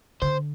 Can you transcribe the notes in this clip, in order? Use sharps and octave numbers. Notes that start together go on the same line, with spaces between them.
D3 C5